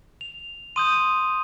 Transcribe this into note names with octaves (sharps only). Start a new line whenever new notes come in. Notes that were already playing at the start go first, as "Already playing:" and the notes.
F7
C6 D#6 G6 D#7